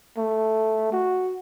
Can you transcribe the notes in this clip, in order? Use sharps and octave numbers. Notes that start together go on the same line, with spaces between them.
A3
F#4